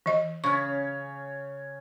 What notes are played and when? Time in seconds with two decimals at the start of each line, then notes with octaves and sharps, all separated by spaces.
0.06 E3 D#5
0.44 C#3 C#4 C#6